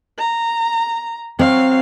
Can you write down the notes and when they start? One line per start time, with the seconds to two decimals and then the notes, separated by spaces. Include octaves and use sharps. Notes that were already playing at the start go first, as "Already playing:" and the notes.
0.18 A#5
1.39 F#3 C4 F5